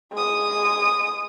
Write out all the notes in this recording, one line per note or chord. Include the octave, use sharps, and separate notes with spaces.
G#3 D#6